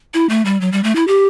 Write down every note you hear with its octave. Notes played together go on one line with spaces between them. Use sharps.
E4
A3
G3
F#3
G3
A3
E4
G4